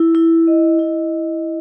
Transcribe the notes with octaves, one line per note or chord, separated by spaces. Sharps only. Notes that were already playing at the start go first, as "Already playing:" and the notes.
Already playing: E4
E4
D#5
E4